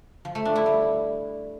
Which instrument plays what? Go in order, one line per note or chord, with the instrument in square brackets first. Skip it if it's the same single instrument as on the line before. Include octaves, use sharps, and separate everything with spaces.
[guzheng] F3
A3
D4
E4
G3